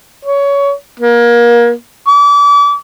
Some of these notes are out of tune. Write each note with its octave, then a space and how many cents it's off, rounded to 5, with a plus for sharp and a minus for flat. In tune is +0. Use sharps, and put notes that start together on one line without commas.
C#5 +20
A#3 +30
D6 -35